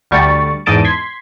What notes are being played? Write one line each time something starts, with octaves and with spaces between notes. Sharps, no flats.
D2 D3 G3 C#6 A6
E2 G#2 D#5 A5 A6 D7
C6 G#6 B6